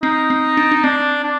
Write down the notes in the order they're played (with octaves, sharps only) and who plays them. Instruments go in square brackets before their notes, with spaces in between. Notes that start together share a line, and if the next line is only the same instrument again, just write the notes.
[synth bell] C4 [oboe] D#4
[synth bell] C4
D4
D4
[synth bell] C4 [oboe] D4
[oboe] D4